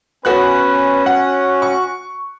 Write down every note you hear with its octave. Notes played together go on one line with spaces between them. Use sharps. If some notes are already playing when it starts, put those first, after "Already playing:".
B3 C#4 F#4 B4 F#6
F#4 F#5
C#6